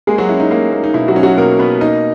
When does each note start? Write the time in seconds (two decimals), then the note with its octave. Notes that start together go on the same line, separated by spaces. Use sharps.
0.07 G#3 A#3 G#4
0.18 F#3 F#4
0.29 C#4 E4
0.40 D#4
0.51 A#3
0.73 A#3
0.84 D#4
0.94 B2 E4
1.08 F#3 F#4
1.16 C#4
1.23 F#3 F#4
1.37 B2 A#3 A#4
1.59 B2 B3 B4
1.81 A#3 D#4 D#5